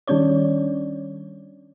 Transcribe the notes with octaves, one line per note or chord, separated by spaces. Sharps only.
D#3 G3 C#4 D4 C#5 D5